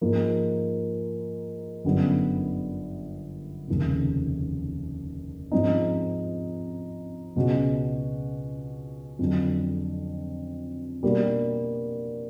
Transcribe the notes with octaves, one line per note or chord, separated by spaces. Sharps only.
G#2 F3 A#3
G1 F#2 D3 G3 B3
F1 D#2 C#3
G#2 F3 G#3 C4 D#4
C#2 B2 G#3 C#4 F#4
F2 D3 F#3
B2 G3 A#3 D4 F#4